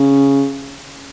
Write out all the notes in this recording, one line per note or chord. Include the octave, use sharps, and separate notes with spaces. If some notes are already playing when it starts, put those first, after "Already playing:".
Already playing: C#3